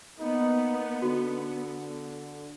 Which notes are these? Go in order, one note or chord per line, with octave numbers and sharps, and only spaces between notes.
A#3 B3 D#4
D3 F#4